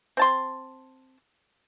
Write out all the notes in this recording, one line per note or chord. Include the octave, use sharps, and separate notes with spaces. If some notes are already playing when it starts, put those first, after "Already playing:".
C4 A5 C6